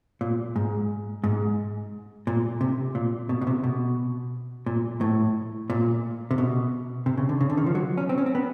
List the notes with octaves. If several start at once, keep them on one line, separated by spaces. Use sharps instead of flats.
A#2
G#2
G#2
A#2
C3
A#2
B2
B2
C3
B2
A#2
A2
A#2
C3
B2
C3
C#3
D3
C#3
D3
D#3
F3
F#3
C#4
C4
C#4
C4
B3